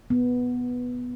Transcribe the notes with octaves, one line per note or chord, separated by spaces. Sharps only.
B3